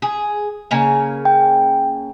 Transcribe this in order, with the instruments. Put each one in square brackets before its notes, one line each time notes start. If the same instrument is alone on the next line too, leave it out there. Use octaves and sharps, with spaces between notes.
[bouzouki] G#4
C#3 A#3 G#5
[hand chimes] G5